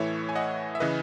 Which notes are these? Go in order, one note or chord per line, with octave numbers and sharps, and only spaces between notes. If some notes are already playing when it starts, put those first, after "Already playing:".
Already playing: A2 E3 A3 C#5 E5
G#5
D#5 F#5
E5
C#3 E3 B4 D#5